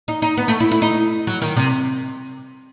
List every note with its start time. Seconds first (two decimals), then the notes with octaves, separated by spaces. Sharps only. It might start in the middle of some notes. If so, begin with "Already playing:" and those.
0.08 D#4
0.22 D#4
0.37 B3
0.48 A3
0.60 E4
0.72 E4
0.82 D#4
1.27 F#3
1.42 D#3
1.56 C3